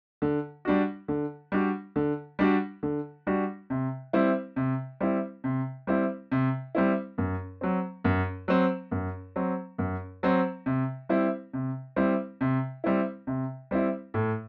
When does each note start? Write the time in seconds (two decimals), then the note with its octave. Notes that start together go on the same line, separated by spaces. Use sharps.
0.22 D3
0.65 G3 D4 F#4
1.08 D3
1.52 G3 D4 F#4
1.96 D3
2.39 G3 D4 F#4
2.83 D3
3.27 G3 D4 F#4
3.70 C3
4.13 G3 C4 E4
4.56 C3
5.00 G3 C4 E4
5.44 C3
5.87 G3 C4 E4
6.32 C3
6.75 G3 C4 E4
7.18 F#2
7.61 F#3 C4
8.04 F#2
8.48 F#3 C4
8.91 F#2
9.36 F#3 C4
9.78 F#2
10.23 F#3 C4
10.66 C3
11.09 G3 C4 E4
11.53 C3
11.96 G3 C4 E4
12.41 C3
12.84 G3 C4 E4
13.27 C3
13.71 G3 C4 E4
14.14 A2